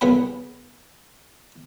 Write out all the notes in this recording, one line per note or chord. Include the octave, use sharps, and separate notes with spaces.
C2 B3 G#4 F#5 B5